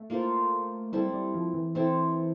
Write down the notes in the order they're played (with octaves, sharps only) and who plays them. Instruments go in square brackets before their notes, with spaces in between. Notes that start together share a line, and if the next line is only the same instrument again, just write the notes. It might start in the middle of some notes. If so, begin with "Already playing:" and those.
Already playing: [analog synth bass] A3
[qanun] A#3 F4 A4 C5
[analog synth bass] G3 [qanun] C4 E4 A4
[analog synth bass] G3
F3
E3
[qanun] C4 E4 A4